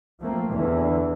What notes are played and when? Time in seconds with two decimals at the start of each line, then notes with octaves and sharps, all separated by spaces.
0.20 F3 A3 A#3 C4
0.50 E2 D3 E3